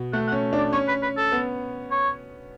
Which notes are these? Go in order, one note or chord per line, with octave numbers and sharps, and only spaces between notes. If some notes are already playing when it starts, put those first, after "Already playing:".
Already playing: B2
A3 F#5
F#5
C#4
D4 D5
C#4 C#5
B4
B4
A4
B3
C#5